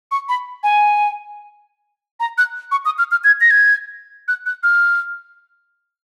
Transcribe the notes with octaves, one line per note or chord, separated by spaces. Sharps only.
C#6
B5
G#5
A#5
F#6
C#6
D#6
F6
F6
G#6
A#6
G#6
F#6
F#6
F6